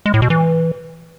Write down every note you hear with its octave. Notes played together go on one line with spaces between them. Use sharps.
G#3
A2
B2
E3